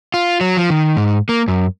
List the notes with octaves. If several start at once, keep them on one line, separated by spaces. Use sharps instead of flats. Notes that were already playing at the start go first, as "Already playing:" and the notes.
F4
F#3
F3
D#3
G#2
A#3
F#2